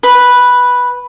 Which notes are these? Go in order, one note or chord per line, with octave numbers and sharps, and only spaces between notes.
B4